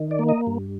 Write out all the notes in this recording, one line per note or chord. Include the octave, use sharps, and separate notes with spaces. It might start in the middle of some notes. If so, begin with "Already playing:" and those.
Already playing: D#3
D5
A#3
D#5
G2